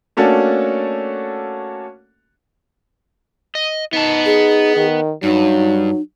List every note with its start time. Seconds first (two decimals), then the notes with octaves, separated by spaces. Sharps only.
0.17 A3 A#3 C#4 D4 F#4 A4
3.55 D#5
3.93 B3 D#4 A5
4.26 G#4
4.76 D#3
5.23 G2 F#3 D#4